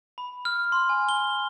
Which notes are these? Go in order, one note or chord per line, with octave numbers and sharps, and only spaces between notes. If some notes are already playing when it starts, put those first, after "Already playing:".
B5
F6
C6
G#5
G7